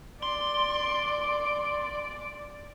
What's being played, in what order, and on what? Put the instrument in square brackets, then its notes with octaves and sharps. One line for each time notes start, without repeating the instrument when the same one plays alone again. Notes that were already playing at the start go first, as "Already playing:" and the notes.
[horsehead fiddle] D5 [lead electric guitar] C6